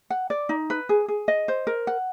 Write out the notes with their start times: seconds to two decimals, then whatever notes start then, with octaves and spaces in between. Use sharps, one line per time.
0.10 F#5
0.30 D5
0.49 D#4
0.70 B4
0.89 G#4
1.08 G#4
1.28 D#5
1.48 C5
1.67 A#4
1.87 F#5